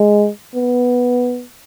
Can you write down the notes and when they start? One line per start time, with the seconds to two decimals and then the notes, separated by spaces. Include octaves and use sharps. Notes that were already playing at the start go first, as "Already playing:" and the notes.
Already playing: G#3
0.55 B3